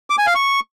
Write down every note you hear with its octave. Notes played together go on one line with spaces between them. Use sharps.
D6
G#5
F5
C#6